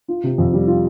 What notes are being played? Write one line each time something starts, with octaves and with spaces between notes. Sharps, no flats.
F4
C3
F2
G3
F4